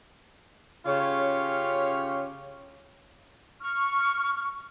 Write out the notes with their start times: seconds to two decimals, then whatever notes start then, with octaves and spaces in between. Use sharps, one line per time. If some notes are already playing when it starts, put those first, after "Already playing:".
0.86 C#3 C#4 F4 G4 C#5
3.61 C#6 F6